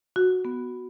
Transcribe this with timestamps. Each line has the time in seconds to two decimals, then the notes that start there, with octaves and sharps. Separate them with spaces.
0.16 F#4
0.45 B3